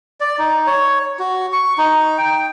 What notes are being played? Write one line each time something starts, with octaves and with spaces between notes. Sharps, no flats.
D5
D#4
C#5
F#4
C#6
D#4
G5